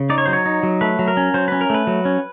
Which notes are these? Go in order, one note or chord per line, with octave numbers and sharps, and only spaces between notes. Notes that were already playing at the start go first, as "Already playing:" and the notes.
Already playing: C#3
D#4 D5
C#5
F#3 C5
C#5
D#4
F#3
A3 B4
F#3
A#4
C#4
F#3 C5
C#4 B4
A#4
A3 B4
F#3
C#4